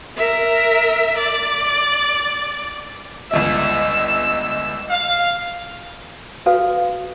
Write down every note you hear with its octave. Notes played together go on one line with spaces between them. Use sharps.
A#4 E5
D5
G1 C#2 D#5 E5 E6
F5
F#4 A4 B4 F5